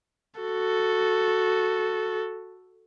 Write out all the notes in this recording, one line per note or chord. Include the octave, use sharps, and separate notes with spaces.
F#4 A4